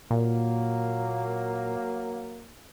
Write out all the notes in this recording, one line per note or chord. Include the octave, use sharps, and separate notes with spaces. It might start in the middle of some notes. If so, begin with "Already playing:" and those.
A#2 F#3 A#3